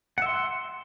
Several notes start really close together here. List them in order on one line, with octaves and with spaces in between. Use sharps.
F#5 E5 C6